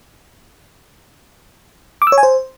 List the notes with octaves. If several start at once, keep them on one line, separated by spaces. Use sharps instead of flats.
D6
E6
C#5
G#5
C5